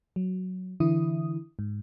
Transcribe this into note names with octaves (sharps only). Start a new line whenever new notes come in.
F#3
D3 E3 E4 D#6
G#2